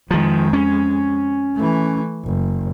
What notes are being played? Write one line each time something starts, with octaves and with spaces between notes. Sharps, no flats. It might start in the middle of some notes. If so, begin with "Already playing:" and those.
F2 D#3 F3 G#3
C#4
E3 A3
F#1